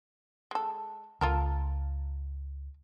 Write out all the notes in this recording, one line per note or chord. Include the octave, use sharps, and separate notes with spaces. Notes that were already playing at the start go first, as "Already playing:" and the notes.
G#3 A4
C#2 F4 A4 A#4